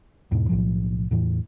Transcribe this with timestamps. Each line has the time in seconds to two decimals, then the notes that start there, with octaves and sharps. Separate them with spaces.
0.32 E2 G#2 B2
0.49 B1 A2 F3
1.11 E2 A2 E3